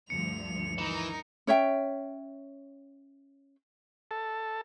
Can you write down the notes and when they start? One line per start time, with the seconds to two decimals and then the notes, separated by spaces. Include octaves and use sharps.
0.10 D2 G2 F3 C#7 F7
0.78 E3 D#4 A#4
1.47 C#4 C#5 E5 G5
4.11 A4